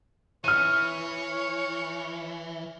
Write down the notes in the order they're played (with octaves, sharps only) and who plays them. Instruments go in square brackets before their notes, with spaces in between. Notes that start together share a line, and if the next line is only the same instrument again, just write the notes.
[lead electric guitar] E3 [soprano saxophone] C#5 [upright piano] F6 D#7